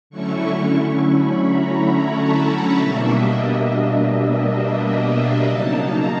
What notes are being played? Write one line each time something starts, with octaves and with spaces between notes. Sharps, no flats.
D3 F#3 A3 C#4 E4 C#6
C#6
B5
A#5
A5
B2 G3 A#3 D4 E5
D#5
E5
D#5
C#3 F#3 A#3 D#4 A5
A#5